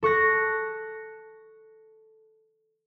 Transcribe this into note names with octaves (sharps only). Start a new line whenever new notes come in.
A4 C#6 F#6 A#6